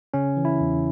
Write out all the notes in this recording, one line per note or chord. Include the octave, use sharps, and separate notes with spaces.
C#3 C#4
E3
E4
E2